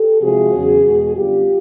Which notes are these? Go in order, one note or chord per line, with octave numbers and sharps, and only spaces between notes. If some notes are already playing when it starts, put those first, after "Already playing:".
Already playing: G4 A4
C3 F3 G#3 F#4 G#4
E2 C#3 F#3
E2 B2 G#3
F#2 D3 G3 B3 F4 G4